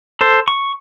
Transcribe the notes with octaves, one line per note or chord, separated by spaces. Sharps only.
A4 C5
C#6